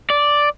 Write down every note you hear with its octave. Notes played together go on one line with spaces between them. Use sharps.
D5